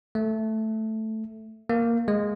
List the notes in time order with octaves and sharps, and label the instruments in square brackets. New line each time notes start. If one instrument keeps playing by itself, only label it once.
[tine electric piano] A3
A#3
G#3